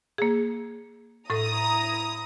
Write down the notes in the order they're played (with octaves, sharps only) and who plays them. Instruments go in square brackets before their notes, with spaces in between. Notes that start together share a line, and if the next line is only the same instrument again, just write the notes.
[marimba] A#3 G#4
[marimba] A2 A4 [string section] E4 A#5 D#6